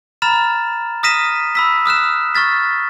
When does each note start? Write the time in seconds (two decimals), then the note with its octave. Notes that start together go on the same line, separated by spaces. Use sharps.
0.22 A#5 B5 F6 A6 E7
1.03 D#6 F6 A#6 B6 D#7 E7
1.55 B5 E6 B6
1.86 D#6 F6 F#6 E7
2.35 C#6 F6 A6 B6